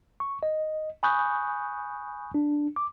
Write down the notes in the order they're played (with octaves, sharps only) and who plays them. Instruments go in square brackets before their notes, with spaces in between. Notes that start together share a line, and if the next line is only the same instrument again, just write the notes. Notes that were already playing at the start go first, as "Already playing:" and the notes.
[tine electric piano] C#6
D#5
G#5 B5 C#6 D#6 F#6 G6
D4
D6